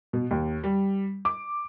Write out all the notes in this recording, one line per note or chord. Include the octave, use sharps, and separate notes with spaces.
B2
D#2
G3
D6